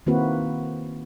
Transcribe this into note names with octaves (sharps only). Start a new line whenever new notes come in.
D#3 A#3 C4 E4 F#4 B4